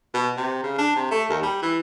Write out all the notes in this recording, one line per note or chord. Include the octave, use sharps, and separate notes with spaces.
B2
C3
C#3
D4
C3
A3
D#2
G3
E3